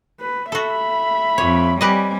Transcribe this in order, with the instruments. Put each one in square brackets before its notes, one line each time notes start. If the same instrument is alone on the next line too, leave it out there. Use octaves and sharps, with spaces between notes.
[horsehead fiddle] B4
[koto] F#4 A4 [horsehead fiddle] E5 B5
[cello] F2 [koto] C#5
[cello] G3 [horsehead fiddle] C4 G#5 [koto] G4 B4 D#5